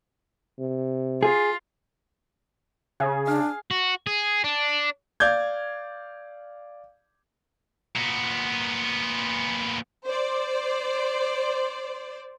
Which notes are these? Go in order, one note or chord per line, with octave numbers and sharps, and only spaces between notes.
C3
F4 G#4
C#3 G#4
D4 F5
F#4
G#4
D4
D5 F5 G6 G#6
A#2 B3
C5 D5